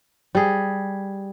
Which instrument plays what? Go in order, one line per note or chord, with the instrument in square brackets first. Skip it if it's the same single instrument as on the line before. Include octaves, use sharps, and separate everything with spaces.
[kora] G3 G#4